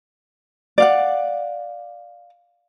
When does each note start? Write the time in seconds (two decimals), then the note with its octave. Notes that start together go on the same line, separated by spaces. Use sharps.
0.78 D5 F5 F#5